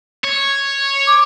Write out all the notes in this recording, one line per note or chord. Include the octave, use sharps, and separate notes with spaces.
C#5
D6